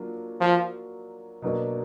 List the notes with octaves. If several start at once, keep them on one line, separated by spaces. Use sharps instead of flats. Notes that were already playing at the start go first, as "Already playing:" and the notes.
Already playing: F#3 A#3 D4 F4
F3
B2 F#3 A#3 D4